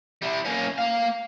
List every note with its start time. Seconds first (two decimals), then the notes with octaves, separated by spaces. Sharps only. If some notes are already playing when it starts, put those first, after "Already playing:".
0.22 G3 E4
0.45 A#3 C#4
0.78 A#3 F5